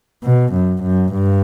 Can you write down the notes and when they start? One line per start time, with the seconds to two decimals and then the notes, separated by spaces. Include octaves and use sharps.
0.24 B2
0.53 F#2
0.83 F#2
1.13 G2